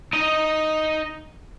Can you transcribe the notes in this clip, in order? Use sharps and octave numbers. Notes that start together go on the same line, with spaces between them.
D#4 D#5